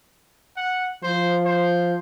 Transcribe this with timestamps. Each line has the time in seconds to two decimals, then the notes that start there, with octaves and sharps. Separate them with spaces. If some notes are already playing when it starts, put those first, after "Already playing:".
0.57 F#5
1.03 F3 C5
1.46 C5